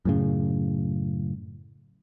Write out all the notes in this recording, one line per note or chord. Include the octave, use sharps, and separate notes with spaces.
F#2 A2 C#3